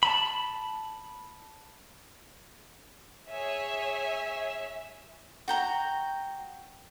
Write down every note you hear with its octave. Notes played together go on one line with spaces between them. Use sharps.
A5 B5
G#4 C#5 E5
F#4 G5 A#5